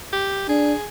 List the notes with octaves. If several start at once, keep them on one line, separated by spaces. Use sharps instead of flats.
G4
D4 G#4